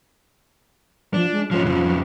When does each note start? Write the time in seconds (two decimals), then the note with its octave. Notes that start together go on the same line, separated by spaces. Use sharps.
1.14 F3 D4
1.32 G#3
1.51 F3 C#4 F4
1.65 F2 C#3 F3